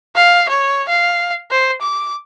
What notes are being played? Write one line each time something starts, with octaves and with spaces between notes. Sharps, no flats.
F5
C#5
F5
C5
D6